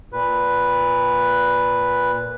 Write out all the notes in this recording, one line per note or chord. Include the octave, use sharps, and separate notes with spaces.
A#2 B4